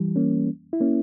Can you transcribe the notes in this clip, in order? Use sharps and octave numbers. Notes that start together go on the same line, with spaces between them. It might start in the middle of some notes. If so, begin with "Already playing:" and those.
Already playing: E3 G3
A#3 C#4
E4
A#3 C#4